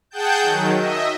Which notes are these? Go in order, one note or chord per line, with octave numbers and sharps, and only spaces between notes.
G#4 F#5 G5 A5 G6
D#3 F#3
D#5 E5